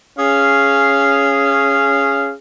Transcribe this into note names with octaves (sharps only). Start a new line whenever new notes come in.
C#4 G#4 F5